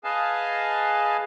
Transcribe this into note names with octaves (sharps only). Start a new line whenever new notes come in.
G#4 B4 D#5 F5 G#5 A5